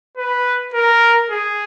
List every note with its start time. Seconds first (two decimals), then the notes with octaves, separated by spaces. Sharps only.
0.17 B4
0.74 A#4
1.30 G#4